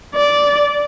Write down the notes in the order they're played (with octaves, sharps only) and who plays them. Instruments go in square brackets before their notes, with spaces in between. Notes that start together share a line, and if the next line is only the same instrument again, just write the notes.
[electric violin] D5